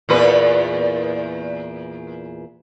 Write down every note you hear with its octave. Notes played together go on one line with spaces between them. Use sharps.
E2 A#2 B4